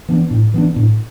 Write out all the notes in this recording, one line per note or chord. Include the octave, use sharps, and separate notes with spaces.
E3 B3 D4
A2
E3 B3 D4
A2